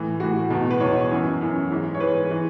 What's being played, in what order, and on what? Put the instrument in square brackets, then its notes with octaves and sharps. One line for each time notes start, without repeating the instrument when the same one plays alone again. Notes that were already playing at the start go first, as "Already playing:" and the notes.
Already playing: [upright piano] A2 E3
A2 E3 F#4
E2 B2
B4
E2 B2 C#5
F#2 E3
F#2 E3
G#2 E3
C#5
G#2 E3 B4
E3